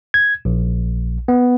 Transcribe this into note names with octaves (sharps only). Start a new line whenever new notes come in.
G#6
A#1
B3